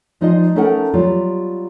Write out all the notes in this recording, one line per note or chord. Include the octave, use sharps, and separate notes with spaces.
F3 G#3 D#4 F4 D5 D#5
A3 C#4 D#4 A4 A#4 F#5
F#3 G3 B3 F4 G4